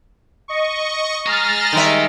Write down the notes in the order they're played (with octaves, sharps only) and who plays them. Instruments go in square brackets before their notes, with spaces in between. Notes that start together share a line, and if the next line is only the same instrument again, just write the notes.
[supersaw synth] D#5 C#6
[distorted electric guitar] G#4 D#5 [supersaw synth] A#5 F6 A6
[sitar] D#3 G3 E5